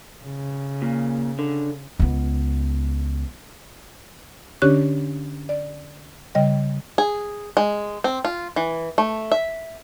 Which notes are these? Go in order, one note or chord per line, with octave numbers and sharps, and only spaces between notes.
C#3
A#2
D3
C#2 B3
D3 C#4 D4 G4 C#5 F#6
D5
C#3 G3 D#5 G5
G#4
G#3
C4
F4
E3
A3
E5